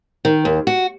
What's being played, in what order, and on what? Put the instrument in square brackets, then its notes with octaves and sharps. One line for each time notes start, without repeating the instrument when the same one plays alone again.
[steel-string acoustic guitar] D#3
D#2
F#4